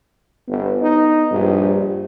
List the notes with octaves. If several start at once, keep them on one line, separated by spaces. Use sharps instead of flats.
G1 B3
D#4
A#1 G2